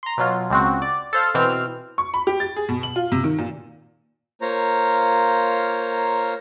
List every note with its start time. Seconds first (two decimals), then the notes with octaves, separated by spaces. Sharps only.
0.03 A#5 C6
0.18 B2 F#3 F4
0.50 C#2 C4 F#4
0.82 D5
1.13 A4 C5 F5
1.34 B2 E3 C4 F6
1.98 C#6
2.14 B5
2.27 G4
2.40 A6
2.56 G#4
2.69 B2
2.83 F#7
2.96 F4
3.12 C3
3.24 D#3
3.39 A#2
4.41 A#3 F4 C5 C#5 A#5